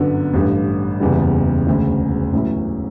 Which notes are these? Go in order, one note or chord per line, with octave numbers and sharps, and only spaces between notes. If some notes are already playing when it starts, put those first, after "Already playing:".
Already playing: G1 F#2 D3 F#3 B3
A1 G2 D3
F#1 E2 C#3 E3 G3
E1 D2 C#3
A1 A2 F#3 C#4 E4